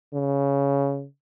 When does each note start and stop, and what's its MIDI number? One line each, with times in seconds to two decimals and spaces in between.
0.13 1.05 49